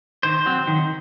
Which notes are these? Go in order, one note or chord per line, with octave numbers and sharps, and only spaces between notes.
D#3 C5
F#3 C4
D#3